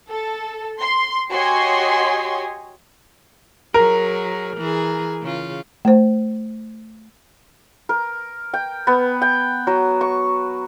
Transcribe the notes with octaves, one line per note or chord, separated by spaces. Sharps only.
A4
C6
F#4 G4 C#5 D#5 G#5 C6
F#3 G#4 A#4
E3 G#4
C#3 F4
A3 C5
A#4
G5
B3
G5
F#3
C#6